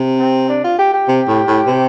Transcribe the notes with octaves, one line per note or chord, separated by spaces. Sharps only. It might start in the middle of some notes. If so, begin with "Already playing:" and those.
Already playing: C3
C4
D4
F4
G4
G4
C3
A2
A2
C3